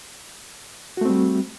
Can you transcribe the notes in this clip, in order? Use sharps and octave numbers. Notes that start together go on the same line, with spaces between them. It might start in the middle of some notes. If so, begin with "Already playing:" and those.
G3 A3 C4 F#4